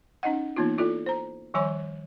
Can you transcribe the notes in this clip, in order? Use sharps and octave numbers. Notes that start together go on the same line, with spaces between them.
C#4 D#4 D#5 F#5
E3 A#3 B3 D#4 F4
E4 F4 A4 D5
C5 A#5
D#3 F3 G3 C#5 G#5 C6